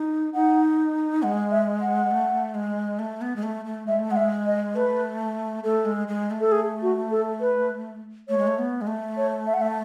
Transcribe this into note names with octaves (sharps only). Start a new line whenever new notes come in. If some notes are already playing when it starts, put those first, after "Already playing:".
Already playing: D#4
D#4 F#5
G#3 F#5
E5
F#5
A3
G#3
A3
B3
G#3
A3
A3
G#3 E5
A3
G#3 F#5
E5
D#5
A3 B4
A3 A4
G#3
G#3
A3
A4
G#4
F#4
A4
B4
A3 C#5
G#3
A3
B3
G#3
A3
C#5
E5
F#5
E5